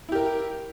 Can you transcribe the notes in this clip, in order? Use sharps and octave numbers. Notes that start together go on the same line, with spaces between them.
E4 G4 A#4